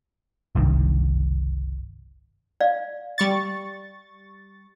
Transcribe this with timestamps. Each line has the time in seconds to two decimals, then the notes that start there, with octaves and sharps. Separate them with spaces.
0.55 F#1 C2 G2 D#3
2.60 D5 F5
3.18 G3 C#6 A6